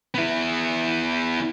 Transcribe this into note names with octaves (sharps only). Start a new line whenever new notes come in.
B3 E4